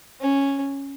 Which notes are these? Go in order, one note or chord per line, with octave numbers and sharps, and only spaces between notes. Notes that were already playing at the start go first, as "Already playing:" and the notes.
C#4